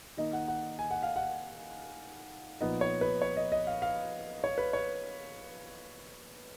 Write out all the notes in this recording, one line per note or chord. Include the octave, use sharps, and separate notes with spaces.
D#3 A#3 D#4 D#5
F#5
F#5
G#5
F#5
F5
F#5
A#2 F3 B3 D#4 D#5
C#5
B4
C#5
D#5
D#5
F5
F5
C#5
B4
C#5